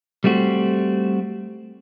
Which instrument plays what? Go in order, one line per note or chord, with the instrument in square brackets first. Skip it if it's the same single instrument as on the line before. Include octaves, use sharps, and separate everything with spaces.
[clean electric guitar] G3 A3 C4 F#4